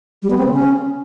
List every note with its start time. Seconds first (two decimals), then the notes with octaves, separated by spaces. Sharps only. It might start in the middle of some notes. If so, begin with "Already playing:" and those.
0.22 G3
0.30 B3
0.38 C4
0.46 C#3
0.54 C#4